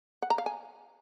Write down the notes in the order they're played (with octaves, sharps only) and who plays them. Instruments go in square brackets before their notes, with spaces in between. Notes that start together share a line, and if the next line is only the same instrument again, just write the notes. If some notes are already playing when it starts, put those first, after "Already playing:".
[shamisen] F#5
A#5
F5
G#5